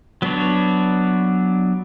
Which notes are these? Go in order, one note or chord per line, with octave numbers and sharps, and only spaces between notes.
F#3 B3 D4 F#4 C#5